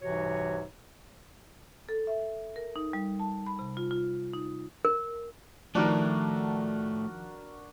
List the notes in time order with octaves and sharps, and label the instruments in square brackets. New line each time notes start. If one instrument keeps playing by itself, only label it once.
[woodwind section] C2 G#2 C3 E3 F#4 C#5
[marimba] A4
E5
A#4
D#4
G3
A5
B5
C3
F4
F4
D#4
[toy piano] A#4
[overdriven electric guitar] A2 [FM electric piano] D#3 F3 [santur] D4 F#4 A#4